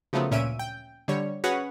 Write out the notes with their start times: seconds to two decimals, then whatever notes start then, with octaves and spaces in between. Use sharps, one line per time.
0.13 C#3 F3 F#3 A3 B3 C4
0.31 D2 A#2 C#4 E5 D7 D#7
0.59 G5
1.08 D3 G3 C#5
1.44 C#4 F#4 G#4 B4 C#5 F#5